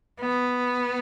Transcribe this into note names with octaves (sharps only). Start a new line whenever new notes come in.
B3